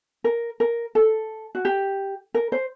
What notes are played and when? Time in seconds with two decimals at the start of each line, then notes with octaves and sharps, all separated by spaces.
0.24 A#4
0.60 A#4
0.95 A4
1.55 F#4
1.65 G4
2.34 A#4
2.52 C5